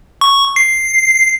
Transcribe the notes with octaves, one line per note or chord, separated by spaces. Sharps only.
C#6
C7